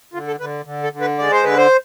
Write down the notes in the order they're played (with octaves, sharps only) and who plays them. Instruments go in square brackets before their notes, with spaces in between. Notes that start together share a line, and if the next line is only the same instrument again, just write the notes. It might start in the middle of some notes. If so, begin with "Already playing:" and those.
[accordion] D3 F4
A4
D3 B4
D3
A4
D3
B4
G#3 D5
C5
D3 B4
C5